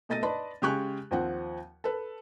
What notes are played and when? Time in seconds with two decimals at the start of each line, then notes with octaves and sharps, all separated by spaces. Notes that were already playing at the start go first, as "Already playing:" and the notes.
0.09 B2 A3 D#5 A6 A#6 D#7
0.23 B4 D5 D#5 A5 B5 C6
0.62 C#3 G#3 G4 G#5 C#6 F#6
1.11 D#2 F3 C4 F#5
1.84 A4 B4